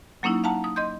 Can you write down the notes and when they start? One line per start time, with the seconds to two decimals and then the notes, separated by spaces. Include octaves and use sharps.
0.23 F#3 A#3 C#4 D#4 E4
0.44 F5 F#5 A5 A#5
0.64 D#6
0.76 D#5 C6 G6